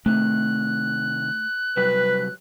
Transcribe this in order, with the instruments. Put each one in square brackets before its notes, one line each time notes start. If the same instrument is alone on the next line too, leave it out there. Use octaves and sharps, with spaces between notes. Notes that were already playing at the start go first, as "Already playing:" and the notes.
[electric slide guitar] C3 D#3 [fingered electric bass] A3 [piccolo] F#6
[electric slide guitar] C3 F#3 G3 [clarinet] B4